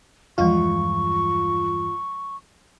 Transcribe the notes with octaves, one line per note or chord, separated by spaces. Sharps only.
E2 G2 F3 G#3 F4 C#6